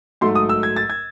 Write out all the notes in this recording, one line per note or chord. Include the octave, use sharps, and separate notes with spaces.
G#2 F#3 A3 C6
D#6
E6
G#6
A6
G#6